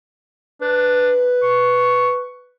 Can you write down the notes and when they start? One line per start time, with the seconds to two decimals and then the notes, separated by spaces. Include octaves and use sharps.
0.62 D4 B4
1.43 C#6